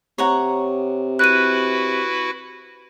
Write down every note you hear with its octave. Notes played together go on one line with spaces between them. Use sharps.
C3 C#5 F#5 A#5
E4 F#4 B4 F#6 D#7